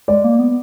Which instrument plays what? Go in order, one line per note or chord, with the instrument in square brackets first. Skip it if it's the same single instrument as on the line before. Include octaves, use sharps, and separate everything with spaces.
[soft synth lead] G#3 [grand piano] D5
[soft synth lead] A#3
B3